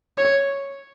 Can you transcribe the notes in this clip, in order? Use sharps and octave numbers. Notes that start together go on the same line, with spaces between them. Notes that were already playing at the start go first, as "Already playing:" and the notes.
C#5